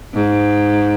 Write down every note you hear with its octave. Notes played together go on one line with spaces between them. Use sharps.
G#2